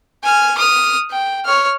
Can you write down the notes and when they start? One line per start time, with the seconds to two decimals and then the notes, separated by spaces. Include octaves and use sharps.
0.24 G#5 F6
0.58 D#6 F6
1.11 G5
1.45 C#5 F6